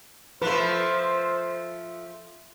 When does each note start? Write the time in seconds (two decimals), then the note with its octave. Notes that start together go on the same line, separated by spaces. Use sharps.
0.42 F3 A3 B4 C5